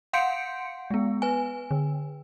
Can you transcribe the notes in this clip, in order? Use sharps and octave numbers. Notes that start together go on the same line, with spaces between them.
F5 F#5 C6 G6 C#7 D7
G#3 B3
B4 G#5
D3